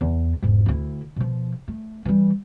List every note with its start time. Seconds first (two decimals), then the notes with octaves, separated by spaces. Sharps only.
0.01 E2
0.43 E1 G#2
0.66 D2 E4
1.16 B2 F3
1.68 A3
2.05 E3 G3